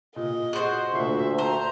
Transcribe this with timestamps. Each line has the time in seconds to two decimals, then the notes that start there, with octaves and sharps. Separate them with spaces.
0.16 A#2 D#5
0.53 F#4 G#4 C5 C6
0.93 D2 A#2 E5 C7
1.38 C5 A#5